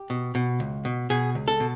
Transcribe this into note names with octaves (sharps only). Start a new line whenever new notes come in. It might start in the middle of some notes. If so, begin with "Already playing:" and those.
Already playing: G4
B2
B2
C#2
B2
B2 G#4
C#2
A4
B2